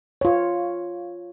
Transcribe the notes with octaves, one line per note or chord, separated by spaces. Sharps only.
F4 C#5